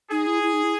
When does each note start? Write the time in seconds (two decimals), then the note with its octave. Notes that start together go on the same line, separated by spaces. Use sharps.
0.10 D#4 G#4
0.27 E4
0.43 E4
0.53 D#4
0.64 E4